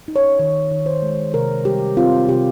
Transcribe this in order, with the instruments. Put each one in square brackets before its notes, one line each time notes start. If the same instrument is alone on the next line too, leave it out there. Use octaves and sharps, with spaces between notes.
[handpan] D#4
C#5
D#3 C#5
D#3
C5
G#3
C3 A#4
G3 G4
C4 F4
C3 G4